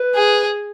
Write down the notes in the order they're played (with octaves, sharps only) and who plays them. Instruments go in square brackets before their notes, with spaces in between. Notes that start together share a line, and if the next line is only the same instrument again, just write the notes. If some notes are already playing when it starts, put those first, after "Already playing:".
Already playing: [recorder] B4
[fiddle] G#4